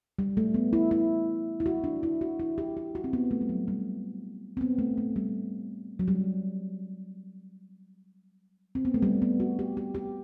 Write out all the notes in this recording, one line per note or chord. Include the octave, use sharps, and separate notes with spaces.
G3
A3
B3
E4
E4
E4
F#4
D4
E4
F#4
E4
G4
G4
F#4
C4
B3
A3
G3
F#3
G3
C4
B3
A3
A3
G3
F#3
G3
C4
B3
A3
G3
B3
F#4
G4
G4
G4